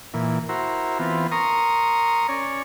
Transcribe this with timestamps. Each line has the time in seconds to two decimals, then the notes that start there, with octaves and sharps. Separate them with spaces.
0.14 A#2 E3
0.49 E4 F#4 A#4 C5
0.99 E3 B3 C4 F4
1.32 A#4 A#5 C6 C#6 D#6
2.29 C#4 C#5 D5